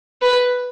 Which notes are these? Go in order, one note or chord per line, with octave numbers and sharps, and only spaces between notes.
B4